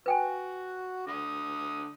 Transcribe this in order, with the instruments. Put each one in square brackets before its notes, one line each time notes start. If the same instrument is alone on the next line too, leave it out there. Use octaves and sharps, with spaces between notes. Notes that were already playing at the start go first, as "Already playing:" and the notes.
[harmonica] F#4 [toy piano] B4 G5 G#5
[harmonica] D3 D#6